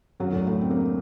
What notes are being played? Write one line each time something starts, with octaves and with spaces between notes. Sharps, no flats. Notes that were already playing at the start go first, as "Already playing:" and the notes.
F#2 F#3
D2 D3
A2 A3
C4
A#3
A3